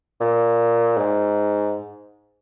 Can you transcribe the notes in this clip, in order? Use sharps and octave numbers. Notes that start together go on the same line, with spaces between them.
A#2
G#2